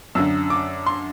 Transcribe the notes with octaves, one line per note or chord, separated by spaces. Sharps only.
F#2 D3 E6
D6
C6